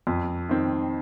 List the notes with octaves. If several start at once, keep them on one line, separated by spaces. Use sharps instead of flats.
F2
D#3 C4